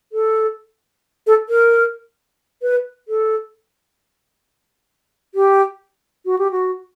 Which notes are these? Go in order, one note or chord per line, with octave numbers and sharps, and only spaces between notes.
A4
A4
A#4
B4
A4
G4
F#4
G4
F#4